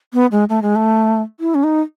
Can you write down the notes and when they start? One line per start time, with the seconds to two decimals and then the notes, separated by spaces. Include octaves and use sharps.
0.14 B3
0.32 G#3
0.49 A3
0.62 G#3
0.76 A3
1.40 E4
1.55 C#4
1.63 D#4